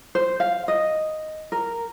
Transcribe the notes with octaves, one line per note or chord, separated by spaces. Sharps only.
C5
F5
D#5
A#4